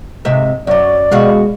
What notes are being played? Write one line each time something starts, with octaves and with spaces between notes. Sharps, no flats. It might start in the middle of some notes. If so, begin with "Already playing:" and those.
G#2 C3 E5
F#2 F#3 D5
B2 G#3 F#4 F5